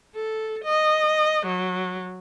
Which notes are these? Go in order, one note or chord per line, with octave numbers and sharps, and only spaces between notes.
A4
D#5
F#3